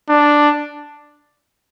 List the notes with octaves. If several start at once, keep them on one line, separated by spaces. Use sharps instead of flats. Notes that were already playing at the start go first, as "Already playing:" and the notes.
D4